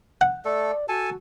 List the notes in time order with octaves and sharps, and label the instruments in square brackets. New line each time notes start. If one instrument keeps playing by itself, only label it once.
[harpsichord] F#5
[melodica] A3 A4 [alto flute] D5
[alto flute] F#4 [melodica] A4 G#5 A5